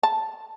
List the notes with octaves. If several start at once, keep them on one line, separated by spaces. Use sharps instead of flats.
A5